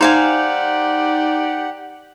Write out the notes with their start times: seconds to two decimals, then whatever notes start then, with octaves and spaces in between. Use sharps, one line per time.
0.01 D#4 G4 C5 D5 F5 F#5 G#5